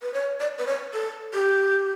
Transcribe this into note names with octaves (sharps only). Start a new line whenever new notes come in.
B4
C#5
D5
B4
C#5
A4
G4